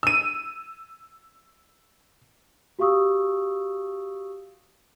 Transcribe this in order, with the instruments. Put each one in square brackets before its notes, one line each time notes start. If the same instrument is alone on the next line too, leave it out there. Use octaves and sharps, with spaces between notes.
[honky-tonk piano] E6 D#7
[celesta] F#4 G4 F5 C#6 D#6 E6